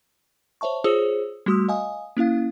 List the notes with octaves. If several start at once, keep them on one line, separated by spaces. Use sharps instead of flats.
C5 C#5 E5 A5 C#6
F4 G#4 C5 C#5 D#6 E6
G3 A3 F#4 C6 D#6 E6
D#5 F5 G#5 D#6
A#3 C#4 E4 F5